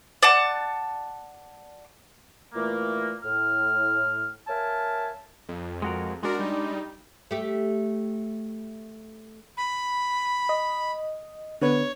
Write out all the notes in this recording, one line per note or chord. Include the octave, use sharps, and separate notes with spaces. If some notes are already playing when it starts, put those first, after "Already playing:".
D5 F#5 A5
A#2 E3 A3 A#3
A2 F6
A#4 C#5 E5 F5 G#5 A5
F2
G#3 F#4 A#4
G#3 D4 F#4 A#4
G3 D#4
A3 G4
B5
D#5
D3 B3 B4 C#5